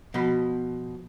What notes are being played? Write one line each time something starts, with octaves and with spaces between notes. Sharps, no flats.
B2 F3 B5